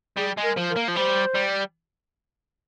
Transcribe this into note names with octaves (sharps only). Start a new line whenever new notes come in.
G3 G#4
G#3
A#4
F3
A#4
A#3
F3
G3 C5
G3